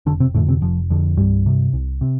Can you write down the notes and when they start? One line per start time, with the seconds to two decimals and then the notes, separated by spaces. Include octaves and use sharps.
0.06 F1 D3 D4
0.20 C3 C4
0.34 F2 A2 D3 A3
0.48 C3 C4
0.62 F1 F3
0.90 F2 D3
1.17 C2 G2 G3
1.46 C3
1.73 C2
2.01 C3